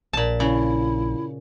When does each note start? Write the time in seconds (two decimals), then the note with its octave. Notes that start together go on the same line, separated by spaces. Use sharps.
0.13 A#1 A#2 A5
0.40 C#3 E4